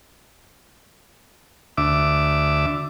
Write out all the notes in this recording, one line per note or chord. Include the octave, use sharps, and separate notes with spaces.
D2 E5 D6